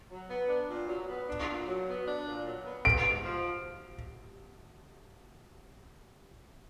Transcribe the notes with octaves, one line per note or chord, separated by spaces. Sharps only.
F#3
B3
D4
A#2
F#3
B3
D4
A#2
F#3
B3
D4
A#2
F#3
B3
B3 D7
G#2
F3